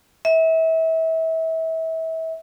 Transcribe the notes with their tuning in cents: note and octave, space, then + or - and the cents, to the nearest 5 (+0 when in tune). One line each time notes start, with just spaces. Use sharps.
E5 -30